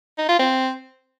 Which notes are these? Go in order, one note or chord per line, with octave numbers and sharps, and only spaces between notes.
D#4
F4
C4